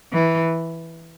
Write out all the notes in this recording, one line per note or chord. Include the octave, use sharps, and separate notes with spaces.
E3